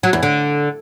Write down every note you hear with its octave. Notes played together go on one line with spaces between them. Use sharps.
F#3
E2
D3